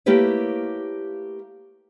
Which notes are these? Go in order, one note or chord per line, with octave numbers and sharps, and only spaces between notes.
A3 A#3 E4 G4 B4 C#5